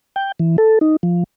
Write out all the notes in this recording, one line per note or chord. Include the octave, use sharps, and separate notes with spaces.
G5
E3
A4
D#4
F3